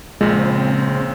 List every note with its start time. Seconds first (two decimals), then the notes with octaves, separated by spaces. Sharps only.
0.21 A#1 A#2 C#3 G#3 C4